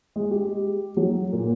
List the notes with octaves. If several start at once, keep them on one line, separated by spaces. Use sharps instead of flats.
G#3
G4
F#3
A#2